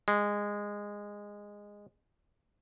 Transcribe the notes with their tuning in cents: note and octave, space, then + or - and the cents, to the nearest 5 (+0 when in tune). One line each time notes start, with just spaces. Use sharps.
G#3 -15